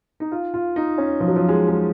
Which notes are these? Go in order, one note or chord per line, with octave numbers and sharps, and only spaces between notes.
D#4
F4
F4
D#4
C#4
F3
F#3
F3
G#3
G#3